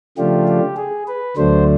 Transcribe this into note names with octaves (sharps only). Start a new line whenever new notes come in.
C#3 F3 A3 D4 F4 G4
G4
G#4
B4
D2 D3 F#3 A3 D4 C5